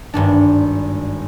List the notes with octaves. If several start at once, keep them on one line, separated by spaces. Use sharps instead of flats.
G#1 G2 D4